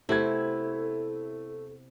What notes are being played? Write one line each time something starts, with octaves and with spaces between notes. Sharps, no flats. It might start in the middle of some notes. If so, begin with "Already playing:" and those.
C3 A3 B3 C4 E4 A4 G#6